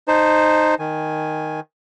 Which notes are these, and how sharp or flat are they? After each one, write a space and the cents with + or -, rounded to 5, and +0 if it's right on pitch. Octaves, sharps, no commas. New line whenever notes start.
D#4 -10 C5 +0 A5 -10
D#3 +0 G#5 +0